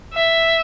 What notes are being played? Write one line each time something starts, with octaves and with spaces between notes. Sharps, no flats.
E5